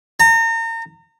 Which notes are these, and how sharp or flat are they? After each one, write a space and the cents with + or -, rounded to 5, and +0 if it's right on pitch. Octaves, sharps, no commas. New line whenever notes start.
A#5 -35